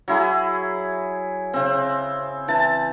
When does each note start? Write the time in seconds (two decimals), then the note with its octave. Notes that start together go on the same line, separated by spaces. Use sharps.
0.08 F#3 E4 G#4
1.53 C#3 C4
2.48 E3 A5